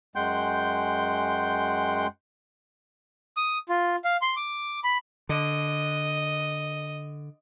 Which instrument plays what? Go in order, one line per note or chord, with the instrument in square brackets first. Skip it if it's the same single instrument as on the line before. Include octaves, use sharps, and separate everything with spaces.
[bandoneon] F#2 G#3 F#5 G5 C6 G6
[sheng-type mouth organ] D#6
F4
F5
C6
D6
B5
[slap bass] D3 [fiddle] D#5